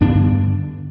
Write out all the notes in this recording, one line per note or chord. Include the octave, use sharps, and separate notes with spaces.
G2 D3 B3 D4